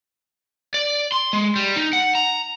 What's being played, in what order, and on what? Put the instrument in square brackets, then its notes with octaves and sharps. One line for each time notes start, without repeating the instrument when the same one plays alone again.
[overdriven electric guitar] D5
C6
G#3
G3
D#4
F#5
A#5